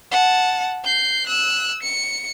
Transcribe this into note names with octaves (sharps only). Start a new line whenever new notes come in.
F#5 A5
G6 C7
E6 F#6
C#7